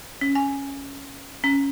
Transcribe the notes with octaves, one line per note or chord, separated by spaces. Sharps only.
C#4
G#5
C#4